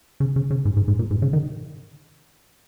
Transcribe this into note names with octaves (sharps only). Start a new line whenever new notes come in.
C#3
C#3
C#3
G#2
G#2
G#2
A#2
G#2
C#3
D#3